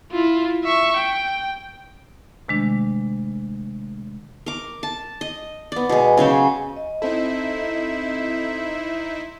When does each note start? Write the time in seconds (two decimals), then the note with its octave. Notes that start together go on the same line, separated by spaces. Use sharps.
0.12 E4 F4
0.64 E5 C#6
0.97 G5
2.48 C3 D#3 G#3 A3 D4
4.46 A#4 D6
4.83 A5
5.21 D#5
5.72 B3 D5
5.89 B2 G#3
6.17 C#3 F#3 F#4 C5
6.77 D#5
7.02 C4 D#4 E4 A4 C5 E5